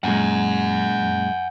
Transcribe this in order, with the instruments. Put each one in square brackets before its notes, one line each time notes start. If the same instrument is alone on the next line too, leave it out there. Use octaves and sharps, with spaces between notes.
[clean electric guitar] F#2 A#2 G#3 [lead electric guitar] F#5 G#5